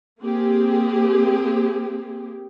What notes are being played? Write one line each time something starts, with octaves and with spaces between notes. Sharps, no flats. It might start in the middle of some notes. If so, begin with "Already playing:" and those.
A#3 C4 G4 G#4